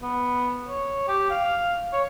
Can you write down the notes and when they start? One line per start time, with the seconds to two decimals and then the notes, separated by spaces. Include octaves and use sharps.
0.02 B3
0.68 C#5
1.08 G4
1.30 F5
1.93 C#5